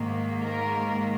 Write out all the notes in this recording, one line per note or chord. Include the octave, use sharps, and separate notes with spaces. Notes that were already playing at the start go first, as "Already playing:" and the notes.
Already playing: G#2 D#3 A#3
A#4